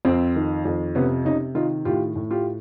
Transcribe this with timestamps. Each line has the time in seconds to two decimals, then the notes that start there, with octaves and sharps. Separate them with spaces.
0.05 F2 C4
0.36 D#3
0.65 F2
0.95 C3 B3 C#4
1.25 C3 C#4 D#4
1.55 D#3 D#4 F4
1.85 A2 F4 G4
2.16 A2
2.31 F4 G4